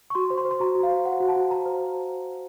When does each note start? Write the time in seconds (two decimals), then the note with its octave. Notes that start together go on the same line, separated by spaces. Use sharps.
0.10 C#6
0.15 F#4 C6
0.30 C5
0.38 C6
0.45 C5
0.51 C6
0.60 F#4 A#5
0.75 F#4
0.83 F5
0.91 C5
1.06 C5 F#5
1.20 F#4
1.29 A5
1.36 F#4
1.51 C5 A#5
1.66 C5